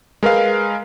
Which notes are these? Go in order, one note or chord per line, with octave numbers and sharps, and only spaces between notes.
G#3 A#4 B4 F5